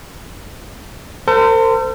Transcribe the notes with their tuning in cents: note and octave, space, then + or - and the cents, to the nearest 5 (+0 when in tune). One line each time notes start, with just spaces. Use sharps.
A4 +45 C5 -30 C6 -20